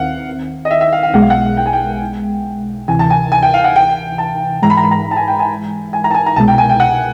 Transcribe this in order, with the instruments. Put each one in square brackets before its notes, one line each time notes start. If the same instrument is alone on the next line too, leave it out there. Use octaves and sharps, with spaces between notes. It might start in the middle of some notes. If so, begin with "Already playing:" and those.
Already playing: [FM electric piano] D#2 D#3 C4 [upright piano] F5 F#5
[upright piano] D#5
E5
E5
F5
F5
[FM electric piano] B1 B2 G#3 [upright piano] F#5
[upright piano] F5
F#5
G5
G#5
G5
[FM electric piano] D2 C3 E3 [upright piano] G#5
[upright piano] A5
G#5
G#5
G5
F5
F#5
G5
A5
[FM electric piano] G#2 E3 G#3 [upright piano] A#5
[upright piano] B5
A#5
B5
A#5
A5
G#5
G5
G#5
G#5
A#5
A5
G#5
A#5
[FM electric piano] C2 B2 G#3 [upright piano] A5
[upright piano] G5
G#5
G5
F#5